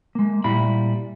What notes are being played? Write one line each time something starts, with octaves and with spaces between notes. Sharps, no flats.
G#3 A#3
A#2 G3 E4 B5